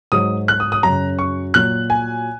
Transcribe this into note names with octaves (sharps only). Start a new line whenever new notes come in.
G#2 F#3 D#6
F#6
D#6
D#6
F#2 C#3 F#3 A#5
C#6
A#2 F#3 F#6
G#5